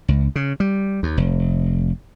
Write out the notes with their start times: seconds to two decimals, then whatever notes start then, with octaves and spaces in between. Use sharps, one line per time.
0.08 C#2
0.36 C#3
0.60 G3
1.03 D#2
1.17 F1